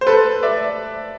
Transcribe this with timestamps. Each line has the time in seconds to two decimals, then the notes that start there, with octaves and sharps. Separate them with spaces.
0.01 C5
0.07 A4 B4
0.43 D5 E5